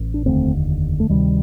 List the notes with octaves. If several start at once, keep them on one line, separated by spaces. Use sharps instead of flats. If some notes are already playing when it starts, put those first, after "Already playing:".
Already playing: A1 A2
D4
F1 D#2 D3 A3 C4
A3
D2 C3 D#3 G3